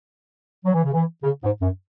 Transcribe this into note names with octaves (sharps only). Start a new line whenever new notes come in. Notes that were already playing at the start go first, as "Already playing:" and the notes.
F#3
E3
C#3
E3
C#3
G#2
F#2